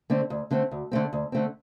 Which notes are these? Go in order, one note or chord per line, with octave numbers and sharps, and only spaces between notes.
D3 A3 C4
D2
D3 A3 C4
D2
D3 A3 C4
D2
D3 A3 C4